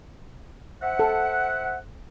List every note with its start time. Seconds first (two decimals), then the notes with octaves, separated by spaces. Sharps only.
0.82 C5 E5 F#5
0.99 A4